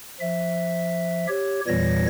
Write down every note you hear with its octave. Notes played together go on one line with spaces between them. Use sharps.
F3 E5
G4 C#5
E2 A#2 E3 G3 C#5 A#6